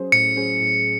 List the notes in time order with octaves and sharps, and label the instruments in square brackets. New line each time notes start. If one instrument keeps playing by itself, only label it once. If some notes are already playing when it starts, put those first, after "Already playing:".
Already playing: [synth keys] F#3 C#4 G#4 C5
[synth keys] A2 [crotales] C#7
[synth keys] F#3 C#4 G#4 C5
A2